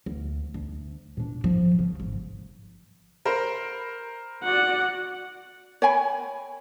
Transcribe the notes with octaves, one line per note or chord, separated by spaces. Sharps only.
D2
D2
A#2 D4
G#2 F3
C#3
G#1
A#4 C5 B5
F#4 D5 F#5
C#5 G5 G#5 B5